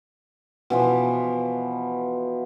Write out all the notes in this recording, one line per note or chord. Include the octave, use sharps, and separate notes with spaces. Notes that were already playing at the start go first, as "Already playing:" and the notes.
B2 E3 F3